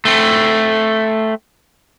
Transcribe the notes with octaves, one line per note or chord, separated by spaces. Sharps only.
A3 C4